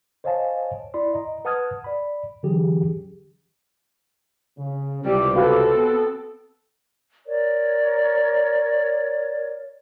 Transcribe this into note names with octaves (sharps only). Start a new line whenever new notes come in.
C5 C#5 D#5 F5 G#5 A5
E4 D5 B5 C6
D#5 A#5
B4 F#5 A5 D#6 F6 G#6
D5 B5
D3 E3 F#3 C#4 G4 G#4
C#3
C#2 C3 G3 E4 G4
C4 F#4 A4 B4 F5
B3
A#4 C#5 D5